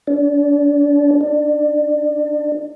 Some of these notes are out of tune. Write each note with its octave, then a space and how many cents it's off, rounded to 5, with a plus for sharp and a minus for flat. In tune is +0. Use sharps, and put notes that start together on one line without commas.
D4 -30
D4 +25